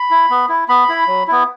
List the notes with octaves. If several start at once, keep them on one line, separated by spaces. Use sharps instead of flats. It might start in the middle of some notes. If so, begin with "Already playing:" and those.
Already playing: B5
E4
B3
E4
B3 B5
E4
F#3
B3 E4